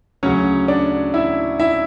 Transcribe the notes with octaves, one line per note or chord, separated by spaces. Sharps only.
D2 C#3 F#3 C#4 C#5
D4 D5
E4 E5
E4 E5